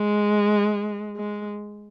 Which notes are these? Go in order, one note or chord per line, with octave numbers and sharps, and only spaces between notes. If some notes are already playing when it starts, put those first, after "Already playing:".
Already playing: G#3
G#3